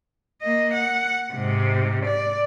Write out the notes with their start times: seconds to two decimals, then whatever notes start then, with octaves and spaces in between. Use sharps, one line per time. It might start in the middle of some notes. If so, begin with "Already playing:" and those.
0.42 A#3 D#5
0.74 F#5
1.34 G#2 C3
2.05 D5